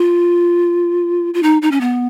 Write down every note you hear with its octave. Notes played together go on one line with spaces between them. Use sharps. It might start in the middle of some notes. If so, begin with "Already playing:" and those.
Already playing: F4
F4
D#4
D#4
C#4
B3